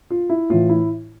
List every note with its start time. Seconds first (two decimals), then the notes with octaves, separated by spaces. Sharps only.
0.10 F4
0.30 E4
0.50 A2 E3 F4
0.70 E4